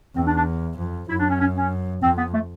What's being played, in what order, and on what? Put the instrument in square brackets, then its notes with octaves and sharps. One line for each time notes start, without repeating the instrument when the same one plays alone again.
[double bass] E2 [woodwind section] C4
[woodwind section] D4
D4
[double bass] F2
[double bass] F#2 [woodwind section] E4
[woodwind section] D4
C#4
C#4
C#4
[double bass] F2 [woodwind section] C4
[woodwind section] B3
A3